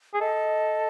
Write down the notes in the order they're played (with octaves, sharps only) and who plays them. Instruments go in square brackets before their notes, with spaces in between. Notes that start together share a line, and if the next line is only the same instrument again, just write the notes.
[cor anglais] G#4
[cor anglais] A4 [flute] D#5